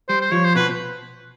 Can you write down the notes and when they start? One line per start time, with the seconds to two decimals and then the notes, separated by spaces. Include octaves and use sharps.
0.09 G3 C5
0.21 C5
0.32 F3 C#5
0.44 C5
0.56 B2 B4